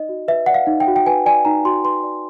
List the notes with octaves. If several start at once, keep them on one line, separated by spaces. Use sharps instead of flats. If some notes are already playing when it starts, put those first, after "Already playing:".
Already playing: D#4 D5 D#5
F#4
B4 E5
D5 F#5
F5
D#4
G5
F#4
G5
B4 G#5
D5 G#5
D#4 A#5
F#4 C6
B4 C6
D5